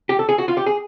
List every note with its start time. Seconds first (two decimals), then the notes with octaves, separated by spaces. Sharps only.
0.09 G4
0.19 A4
0.29 G#4
0.38 F#4
0.48 F4
0.57 G4
0.66 G#4